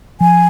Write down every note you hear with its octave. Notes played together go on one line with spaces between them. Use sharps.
F3 G#5